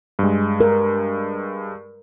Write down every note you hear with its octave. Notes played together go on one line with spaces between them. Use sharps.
G2 G#3
A#4